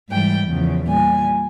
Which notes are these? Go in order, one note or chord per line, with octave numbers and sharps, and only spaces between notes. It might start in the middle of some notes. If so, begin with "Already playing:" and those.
G#2 E3 G3 G5
E2 C#3 F3
A#2 G3 G#5